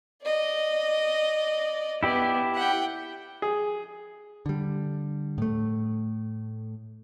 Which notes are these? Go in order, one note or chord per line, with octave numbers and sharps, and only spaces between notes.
D5 D#5
B3 E4 G4 D5
F#5 G5
G#4
D3 G3
A2 A3